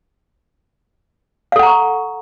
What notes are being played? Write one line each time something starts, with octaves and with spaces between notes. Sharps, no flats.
A4 F5 F#5 A#5 C#6